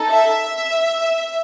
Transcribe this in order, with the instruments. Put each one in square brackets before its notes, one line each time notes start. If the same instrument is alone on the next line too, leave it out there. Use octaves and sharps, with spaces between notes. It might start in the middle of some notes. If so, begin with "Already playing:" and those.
Already playing: [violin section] D#4 A4
E5